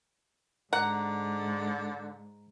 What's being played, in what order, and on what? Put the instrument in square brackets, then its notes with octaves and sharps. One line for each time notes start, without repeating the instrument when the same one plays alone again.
[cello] G#2 [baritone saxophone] D3 [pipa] F#5 [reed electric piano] A#5